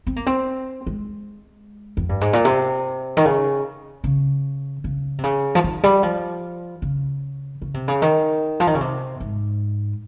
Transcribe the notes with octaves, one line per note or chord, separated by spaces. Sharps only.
C4
A#3
C4
G#3
F2
G2
G#2
A#2
C3
D#3
C#3
C#3
C#3
C3
C#3
F3
D#3
G3
F3
C#3
C#3
C3
C#3
D#3
F3
D#3
C#3
C3
G#2